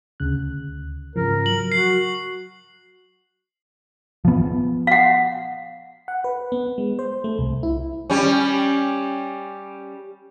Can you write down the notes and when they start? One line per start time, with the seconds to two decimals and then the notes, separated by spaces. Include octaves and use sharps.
0.20 D2 C#3 F#6
1.16 G#2 C#3 F3 A#4
1.46 F#3 F#7
1.72 F#4 C7
4.25 F3 B3
4.87 F5 F#5
6.08 F#5
6.24 B4
6.52 B3
6.78 G#3
6.99 C5
7.24 A3
7.38 C2
7.63 E4
8.10 G3 C#4